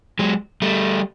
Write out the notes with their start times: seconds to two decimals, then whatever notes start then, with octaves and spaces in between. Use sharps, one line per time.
0.19 F#3 G#3
0.62 G3 A3